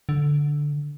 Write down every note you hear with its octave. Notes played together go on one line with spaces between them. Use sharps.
D3